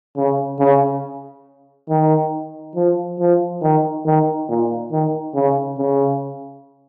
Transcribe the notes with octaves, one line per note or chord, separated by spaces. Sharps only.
C#3
C#3
D#3
F3
F3
D#3
D#3
A#2
D#3
C#3
C#3